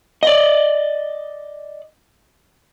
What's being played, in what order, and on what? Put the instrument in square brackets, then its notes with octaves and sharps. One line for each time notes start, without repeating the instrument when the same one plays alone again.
[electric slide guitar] D5 D#5